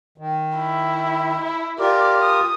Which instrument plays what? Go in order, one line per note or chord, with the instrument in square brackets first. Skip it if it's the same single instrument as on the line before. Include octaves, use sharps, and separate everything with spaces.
[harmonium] D#3
[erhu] E4
E4
[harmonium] F4 G4 A#4 [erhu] D5
[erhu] D#6